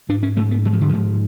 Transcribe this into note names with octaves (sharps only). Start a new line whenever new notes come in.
G#2 D4
C#4
G#2 A3
B3
G#2 F#3
F3
D3
G#2 F3